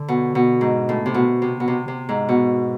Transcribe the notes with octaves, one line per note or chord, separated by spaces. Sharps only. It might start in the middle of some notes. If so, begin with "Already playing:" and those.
Already playing: D3
B2
B2
G#2
A2
C3
B2
C3
B2
C3
C3
G#2
B2